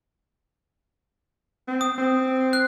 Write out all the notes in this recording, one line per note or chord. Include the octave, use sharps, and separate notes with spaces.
C4
D#6
C4
F#6